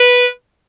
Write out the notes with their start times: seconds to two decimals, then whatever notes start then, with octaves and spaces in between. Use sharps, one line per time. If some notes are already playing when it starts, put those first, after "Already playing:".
Already playing: B4